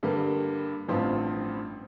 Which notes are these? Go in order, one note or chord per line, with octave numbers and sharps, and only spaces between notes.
G2 D3 G3 A#3
A1 G2 F3 C4 F4